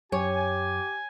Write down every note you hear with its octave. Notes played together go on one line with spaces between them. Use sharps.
F#2 G4 C#5 G#5